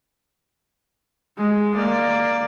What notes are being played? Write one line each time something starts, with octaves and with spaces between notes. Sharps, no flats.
G#3
A#3 D5